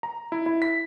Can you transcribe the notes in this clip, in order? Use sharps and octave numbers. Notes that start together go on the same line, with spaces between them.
A#5
E4
E4
B6